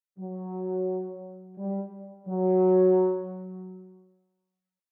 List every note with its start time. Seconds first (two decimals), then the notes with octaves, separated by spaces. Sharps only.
0.18 F#3
1.57 G3
2.27 F#3